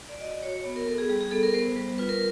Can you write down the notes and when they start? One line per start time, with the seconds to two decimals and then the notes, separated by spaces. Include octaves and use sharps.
0.09 D5
0.20 F#4 D#5
0.43 F#4 C#5
0.65 B3
0.76 A#4
0.87 B3 A4
0.98 G#4
1.09 G3 G#4
1.21 G#4
1.31 B3 A4
1.43 A#4
1.54 B3 C5
1.76 G3
1.98 F4 B4
2.09 A#4